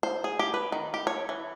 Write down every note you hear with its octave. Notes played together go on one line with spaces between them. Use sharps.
C5
G#4
G4
B4
D#3
G4
C#5
E3